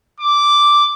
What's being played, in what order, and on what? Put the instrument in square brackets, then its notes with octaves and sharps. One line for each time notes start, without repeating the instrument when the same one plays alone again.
[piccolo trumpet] D6